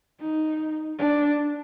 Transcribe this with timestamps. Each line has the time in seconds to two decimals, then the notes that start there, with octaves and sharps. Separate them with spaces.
0.21 D#4
0.99 D4